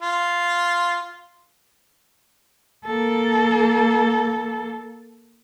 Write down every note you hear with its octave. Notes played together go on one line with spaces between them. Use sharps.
F4
A#3 A4